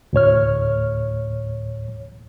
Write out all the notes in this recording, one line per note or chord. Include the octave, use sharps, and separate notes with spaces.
D2 A2 C#5 F6